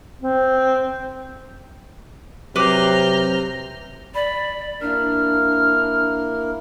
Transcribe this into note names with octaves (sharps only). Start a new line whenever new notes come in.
C4
C3 F#3 B4 C5 A#5 D6 F6 G6
D5 B5
A#3 D4 E4 A#4 F6